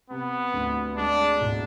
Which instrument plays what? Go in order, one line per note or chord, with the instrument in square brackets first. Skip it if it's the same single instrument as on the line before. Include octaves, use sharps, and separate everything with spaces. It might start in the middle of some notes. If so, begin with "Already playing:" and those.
[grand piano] C3 [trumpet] B3
[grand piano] D2
[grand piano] G#3 [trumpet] D4
[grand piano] E1